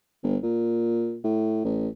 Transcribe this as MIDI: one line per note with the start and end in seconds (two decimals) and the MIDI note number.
0.23 0.37 31
0.43 1.19 46
1.24 1.60 45
1.65 1.88 33